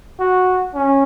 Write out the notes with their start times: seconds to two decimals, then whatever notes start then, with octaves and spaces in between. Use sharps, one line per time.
0.20 F#4
0.75 C#4